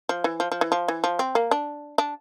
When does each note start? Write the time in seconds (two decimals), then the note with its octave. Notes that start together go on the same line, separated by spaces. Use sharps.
0.09 F3
0.24 E3
0.40 F3
0.52 F3
0.61 E3
0.72 F3
0.88 E3
1.04 F3
1.19 C4
1.35 A#3
1.51 D4
1.98 D4